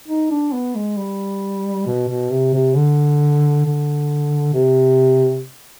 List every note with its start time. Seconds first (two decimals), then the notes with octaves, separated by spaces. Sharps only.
0.08 D#4
0.31 D4
0.52 B3
0.75 G#3
0.97 G3
1.87 B2
2.09 B2
2.31 C3
2.54 C3
2.76 D3
3.65 D3
4.53 C3